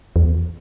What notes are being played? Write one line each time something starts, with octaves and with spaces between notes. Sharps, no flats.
E2